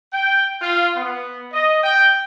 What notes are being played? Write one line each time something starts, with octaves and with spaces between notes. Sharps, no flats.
G5
F4
B3
D#5
G5